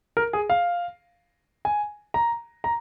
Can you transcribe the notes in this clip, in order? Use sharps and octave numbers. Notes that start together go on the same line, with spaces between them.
A#4
G#4
F5
G#5
A#5
A#5